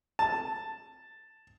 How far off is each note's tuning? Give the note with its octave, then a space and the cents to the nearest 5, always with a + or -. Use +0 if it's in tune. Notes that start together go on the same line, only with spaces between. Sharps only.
A5 +5